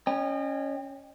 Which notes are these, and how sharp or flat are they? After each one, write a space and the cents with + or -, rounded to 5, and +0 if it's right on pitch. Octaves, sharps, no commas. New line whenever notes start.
C#4 +0 D#5 -30 G5 +25